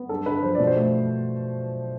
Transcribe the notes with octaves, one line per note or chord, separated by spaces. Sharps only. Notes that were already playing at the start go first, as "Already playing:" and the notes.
Already playing: B3
G2 A4
D3 B4
F3 C5
B2 D5
C5
A3